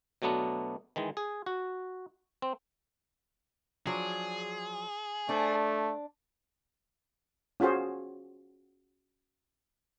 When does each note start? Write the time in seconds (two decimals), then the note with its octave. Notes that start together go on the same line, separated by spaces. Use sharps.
0.22 B2 F#3 A3 B3 D4
0.96 D#3 E3 G#3
1.17 G#4
1.46 F#4
2.42 C4
3.87 F3 F#3 D4 G#4
5.29 A3 D4 C5
7.60 C#4 F4 F#4 G#4 C5